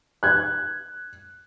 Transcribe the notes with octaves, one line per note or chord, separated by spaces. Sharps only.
F#6 G#6